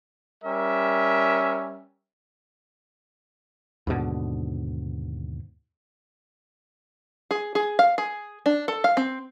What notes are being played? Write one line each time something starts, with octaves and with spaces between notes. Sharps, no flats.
G3 C#4 A#4 E5
D#2 G#2 B2 D3
G#4
G#4
F5
G#4
D4
A4
F5
C4